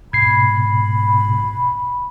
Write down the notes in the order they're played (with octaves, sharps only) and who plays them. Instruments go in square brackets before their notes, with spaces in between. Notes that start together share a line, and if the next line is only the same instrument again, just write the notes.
[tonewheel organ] G#2 B2 [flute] B5 [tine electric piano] G#6 C7